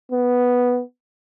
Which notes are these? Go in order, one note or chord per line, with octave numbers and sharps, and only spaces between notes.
B3